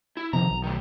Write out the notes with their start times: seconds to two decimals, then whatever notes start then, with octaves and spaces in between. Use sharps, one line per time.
0.17 E4
0.33 C3 D#3 F3 A#5
0.50 B1
0.63 D#3 A3